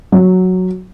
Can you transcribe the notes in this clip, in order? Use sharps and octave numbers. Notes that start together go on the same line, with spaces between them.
F#3